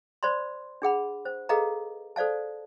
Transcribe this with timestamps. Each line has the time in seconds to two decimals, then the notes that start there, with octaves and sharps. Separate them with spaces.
0.23 C5 D5 B5 C6
0.82 D4 G#4 F#5 B5
1.25 C5
1.49 G#4 A4 B4 D#5 F5 A#5
2.16 A4 C5 D5 F5 A5